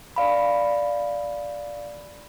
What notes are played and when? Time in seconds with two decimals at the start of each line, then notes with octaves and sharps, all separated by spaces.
0.16 D5 F5 B5